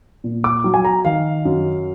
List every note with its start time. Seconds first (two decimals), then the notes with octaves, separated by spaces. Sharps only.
0.24 A#2
0.44 D6
0.64 F#3
0.74 G#5
0.85 A#5
1.05 D#3 F5
1.45 F#2